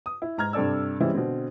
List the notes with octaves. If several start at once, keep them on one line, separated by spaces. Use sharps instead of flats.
D#6
E4
G#2 A#5 F6 G#6
G2 C3 A4 D5 E6
E3 G3 G#3 C4 C#4 E4
B2 D3 C4